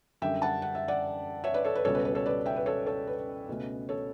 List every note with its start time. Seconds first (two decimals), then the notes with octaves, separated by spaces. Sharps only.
0.22 F#2 D3 G3 E5 G5
0.42 F#5 A5
0.62 F#5
0.75 E5
0.88 D5 F#5
1.44 C#5 E5
1.54 B4 D5
1.64 A4 C#5
1.75 B4
1.85 C#2 B2 G3 C#4 A4 C#5
1.95 B4
2.05 B4
2.15 A4 C#5
2.26 B4 D5
2.46 E5 G5
2.56 B4
2.66 A4 C#5
2.87 A4 C#5
3.07 B4
3.48 C#2 B2 A3 C#4
3.89 A4 C#5